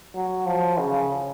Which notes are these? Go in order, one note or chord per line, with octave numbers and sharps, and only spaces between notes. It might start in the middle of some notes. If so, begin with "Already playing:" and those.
F#3
F3
C#3